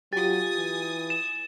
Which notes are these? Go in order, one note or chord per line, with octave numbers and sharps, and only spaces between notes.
F#3 F4 G4 G#5 D#6 A6
E3
E7